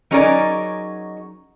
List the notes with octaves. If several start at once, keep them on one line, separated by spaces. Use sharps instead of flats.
F#3 C#4 D#4 G#4 A#4 D5